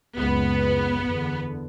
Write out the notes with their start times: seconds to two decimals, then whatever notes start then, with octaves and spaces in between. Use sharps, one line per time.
0.17 F#1 C#2 B3
1.05 E2 D3